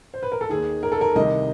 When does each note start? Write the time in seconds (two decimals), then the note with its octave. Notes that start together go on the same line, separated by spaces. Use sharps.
0.14 C5
0.23 B4
0.32 A#4
0.41 A4
0.49 D#2 D#3 G#4
0.83 A#4
0.92 A4
1.01 A#4
1.15 C2 C3 D#3 D#5